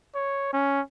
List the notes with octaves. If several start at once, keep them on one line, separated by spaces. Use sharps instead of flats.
C#5
C#4